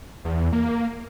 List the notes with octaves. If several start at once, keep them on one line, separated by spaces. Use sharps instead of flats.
E2
A#3